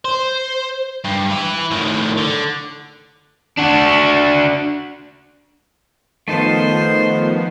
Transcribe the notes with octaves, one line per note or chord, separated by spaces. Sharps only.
C5
G2
E4 B4
A2 D#3
D3
D4 F#4
D#3 F3 A3 B3 D#4 C5 A5 C6